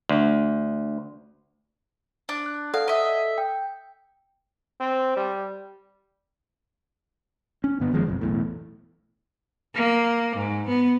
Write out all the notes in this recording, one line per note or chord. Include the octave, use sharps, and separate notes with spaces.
D2
D4
F#6
A4 D5 F5 F#5
D#5 E5
G5
C4
G3
C#4
G2 D3 B3
F#1 D#3 F3 G#3
F#1 B1 F2
B1 E2 A2
A#3
G#2
B3